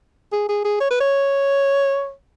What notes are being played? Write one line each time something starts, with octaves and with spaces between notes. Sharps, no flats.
G#4
G#4
G#4
C#5
B4
C#5